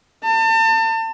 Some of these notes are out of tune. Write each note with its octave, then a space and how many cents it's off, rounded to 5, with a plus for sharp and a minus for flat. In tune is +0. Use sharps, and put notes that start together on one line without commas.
A5 +35